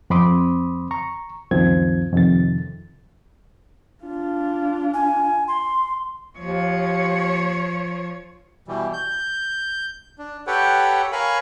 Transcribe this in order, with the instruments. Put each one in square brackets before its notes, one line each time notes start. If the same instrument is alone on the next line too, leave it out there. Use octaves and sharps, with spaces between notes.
[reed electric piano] F2 C4 B5 C6 D6 D#6
A#5 C#6
C#2 F#2 D#3 F3 C4 G#6
F2 C3 D#3 A6
[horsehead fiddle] D4 F4
[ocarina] G#5
C6
[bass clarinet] D#2 [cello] F3 C#5
[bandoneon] B2 E3 G3
G6
D4
G4 A4 B4 C#5 F#5 G5
A#4 C#5 F5 G#5 B5 C#6